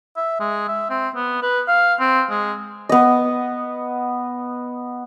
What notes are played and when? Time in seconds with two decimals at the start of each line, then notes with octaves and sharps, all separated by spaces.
0.17 E5
0.40 G#3
0.68 E5
0.90 C4
1.15 B3
1.42 B4
1.68 F5
2.00 C4
2.30 G#3
2.89 B3 D#5